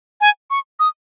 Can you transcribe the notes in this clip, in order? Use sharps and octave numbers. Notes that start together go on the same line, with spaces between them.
G#5
C#6
D#6